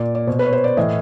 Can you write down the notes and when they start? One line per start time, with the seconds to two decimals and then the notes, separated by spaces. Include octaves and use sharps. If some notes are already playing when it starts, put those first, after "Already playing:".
Already playing: A#2 D5
0.15 D5
0.27 B2 C5
0.39 B4
0.46 C#5
0.53 C5
0.64 D5
0.77 A2 E3 D#5